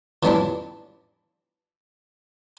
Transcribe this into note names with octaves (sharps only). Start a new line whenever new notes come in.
E3 F3 G3 C#4 D4 E4